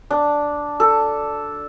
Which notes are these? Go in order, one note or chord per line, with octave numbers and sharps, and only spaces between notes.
D4
A4